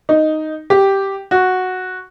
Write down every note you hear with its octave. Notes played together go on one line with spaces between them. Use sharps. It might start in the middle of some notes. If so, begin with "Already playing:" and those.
D#4
G4
F#4